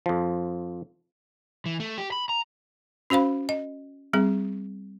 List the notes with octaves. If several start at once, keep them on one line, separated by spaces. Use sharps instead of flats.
F2 F3
E3
A3
G4
B5
A#5
C#4 F#4 C5 F5 B5
D#5
G3 C4 G#4